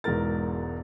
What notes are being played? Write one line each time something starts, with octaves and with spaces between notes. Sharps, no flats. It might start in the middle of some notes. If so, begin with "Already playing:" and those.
E1 G#2 B2 E3 A#4 A6